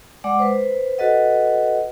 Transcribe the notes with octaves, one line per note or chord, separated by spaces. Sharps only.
G#3 D5 F#5 D6
B4 C5
F#4 A4 B4 D#5 F#5